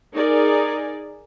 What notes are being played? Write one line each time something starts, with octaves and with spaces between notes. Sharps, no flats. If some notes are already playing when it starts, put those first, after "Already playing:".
D#4 G#4 A#4 D5